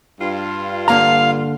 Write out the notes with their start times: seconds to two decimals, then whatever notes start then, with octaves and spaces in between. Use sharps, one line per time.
0.21 G2 F4
0.88 D3 A#3 F5 A#5